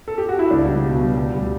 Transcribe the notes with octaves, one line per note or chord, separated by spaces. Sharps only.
A4
G4
F#4
E4
C#2 D4
G3
B2
G3
D2
G3